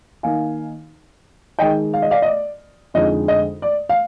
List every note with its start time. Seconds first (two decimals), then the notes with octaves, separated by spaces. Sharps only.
0.23 D#3 A#3 D#4 F5 G#5
1.59 D#3 G#3 D#4 D#5 G5
1.94 F5
2.02 D#5
2.11 D5 F5
2.22 D#5
2.26 D5
2.94 F2 D3 G#3 D#4 D#5
3.28 D#5
3.62 D5
3.89 F5